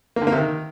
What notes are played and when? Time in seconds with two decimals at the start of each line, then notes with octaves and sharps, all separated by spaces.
0.16 A#3
0.22 D3
0.27 A#3
0.32 C3
0.37 D#3